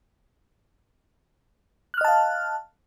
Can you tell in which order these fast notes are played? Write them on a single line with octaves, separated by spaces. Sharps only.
F#6 F6 D#5 A5 F5